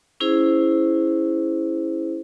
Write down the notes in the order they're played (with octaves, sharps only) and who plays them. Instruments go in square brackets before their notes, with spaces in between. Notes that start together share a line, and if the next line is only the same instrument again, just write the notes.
[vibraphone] C#4 E4 G#4 C5